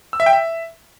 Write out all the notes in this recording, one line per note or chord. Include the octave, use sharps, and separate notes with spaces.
E6
E5
G5
E5